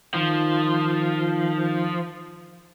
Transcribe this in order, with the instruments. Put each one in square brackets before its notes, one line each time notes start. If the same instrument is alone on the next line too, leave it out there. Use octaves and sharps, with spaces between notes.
[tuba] D#3 [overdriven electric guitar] F3